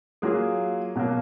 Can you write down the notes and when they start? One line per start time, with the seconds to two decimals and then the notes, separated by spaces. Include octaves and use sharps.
0.22 F#3 A#3 F4 G#4
0.95 B2 F#3 A#3